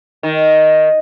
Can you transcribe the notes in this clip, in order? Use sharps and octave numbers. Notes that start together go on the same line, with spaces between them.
D#3